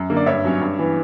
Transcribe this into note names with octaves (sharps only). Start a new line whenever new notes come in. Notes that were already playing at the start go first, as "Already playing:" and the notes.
Already playing: F#2
D3 A#3
D5
G2 C#5 E5
F#3 C#4
G2
E3 B3